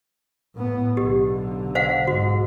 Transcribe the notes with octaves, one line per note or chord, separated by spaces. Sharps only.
A2 B3
B1 D3 G4
C5 F5 F#5
G#2 F#4